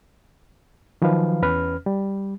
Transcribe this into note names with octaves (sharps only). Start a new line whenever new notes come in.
D#3 F3 F#3 B4 F5
E2 C#4 B4 F6
G3